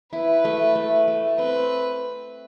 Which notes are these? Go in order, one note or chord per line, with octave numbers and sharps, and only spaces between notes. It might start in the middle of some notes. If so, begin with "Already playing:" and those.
E4 B4
A3
A3
A3
C4 B4